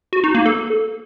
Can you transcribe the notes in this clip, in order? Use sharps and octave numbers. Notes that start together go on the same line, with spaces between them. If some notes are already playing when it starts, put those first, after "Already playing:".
F#4
D#4
A#3
A4